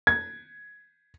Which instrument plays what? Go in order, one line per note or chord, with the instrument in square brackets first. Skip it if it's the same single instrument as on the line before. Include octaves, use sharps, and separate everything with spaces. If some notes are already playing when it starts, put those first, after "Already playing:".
[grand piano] G#6